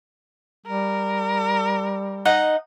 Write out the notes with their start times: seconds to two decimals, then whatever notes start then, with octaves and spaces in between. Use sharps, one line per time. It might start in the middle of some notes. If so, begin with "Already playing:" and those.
0.66 G3 A#4
2.25 D#4 D#5 F#5